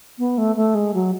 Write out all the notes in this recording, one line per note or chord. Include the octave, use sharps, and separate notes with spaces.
B3
A3
A3
G#3
F#3